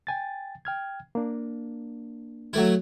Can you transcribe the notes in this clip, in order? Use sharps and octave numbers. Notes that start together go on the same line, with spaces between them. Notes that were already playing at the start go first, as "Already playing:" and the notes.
G5 G#5 A6
G5 F6 G#6
A#3 D4
F#3 A3 E4